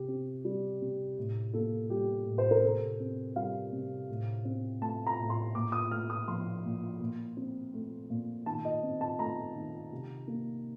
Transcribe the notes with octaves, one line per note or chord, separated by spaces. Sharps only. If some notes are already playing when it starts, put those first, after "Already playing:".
Already playing: C3 G4
C4
G3
C3
A2
A#3 A4
G3 G4
A2
C5
A#4
C3 A4
C4
G3 F5
C3
A2
C4
A3 A5
A#5
A2
C6
A#2 D6
D#6
A3 F6
D#6
F3 C6
A#2
A#2
C4
A3
A#2
D#3 A5
D#5
C4
A5
A3 A#5
D#3
C3
A#3